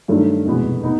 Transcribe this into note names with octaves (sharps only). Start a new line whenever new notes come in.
G2 D#3 F#3 A3 D4
F1 E2 B2 G#3 B3
B3 D#4